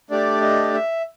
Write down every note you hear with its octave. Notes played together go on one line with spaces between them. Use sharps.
A3 D4 G4 D5
D#5
E5